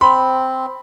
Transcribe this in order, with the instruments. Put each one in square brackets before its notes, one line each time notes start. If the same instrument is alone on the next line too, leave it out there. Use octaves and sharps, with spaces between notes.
[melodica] C4 [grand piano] B5 [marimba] C6